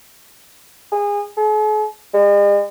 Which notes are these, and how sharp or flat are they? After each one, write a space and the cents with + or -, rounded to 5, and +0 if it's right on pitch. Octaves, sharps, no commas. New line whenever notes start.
G#4 -25
G#4 +45
G#3 -45